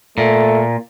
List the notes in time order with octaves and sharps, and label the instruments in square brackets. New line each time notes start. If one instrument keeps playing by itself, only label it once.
[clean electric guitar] A#2 [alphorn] A3